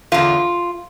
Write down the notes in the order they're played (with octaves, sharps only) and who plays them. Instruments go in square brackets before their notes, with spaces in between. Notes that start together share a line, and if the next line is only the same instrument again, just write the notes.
[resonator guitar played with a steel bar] E2 D3 F4